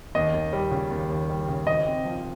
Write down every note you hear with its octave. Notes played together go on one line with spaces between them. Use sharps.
D#2 D#5
D#2
G3
C#3
D#2
D#2
G3
C#3
G#1 D#5
C4
F3